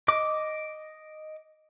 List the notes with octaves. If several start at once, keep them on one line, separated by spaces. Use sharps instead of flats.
D#5 D6